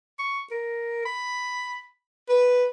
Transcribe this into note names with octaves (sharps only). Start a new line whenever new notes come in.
C#6
A#4
B5
B4